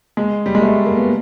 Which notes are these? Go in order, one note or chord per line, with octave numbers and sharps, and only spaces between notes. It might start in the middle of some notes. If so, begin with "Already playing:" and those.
G#3
G3
G#3
A3
A#3
B3